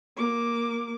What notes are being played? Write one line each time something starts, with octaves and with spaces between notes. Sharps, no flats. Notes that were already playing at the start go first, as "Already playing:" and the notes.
A#3 D6